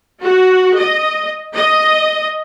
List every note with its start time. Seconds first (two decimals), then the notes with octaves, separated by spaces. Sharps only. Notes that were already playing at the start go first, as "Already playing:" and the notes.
0.23 F#4
0.77 D#5
1.55 D#5